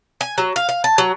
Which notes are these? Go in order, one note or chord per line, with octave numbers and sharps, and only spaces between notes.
G#5
F#3
F5
F5
A5
F#3